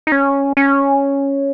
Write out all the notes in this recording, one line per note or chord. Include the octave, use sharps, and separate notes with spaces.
D#4
C#4
C#4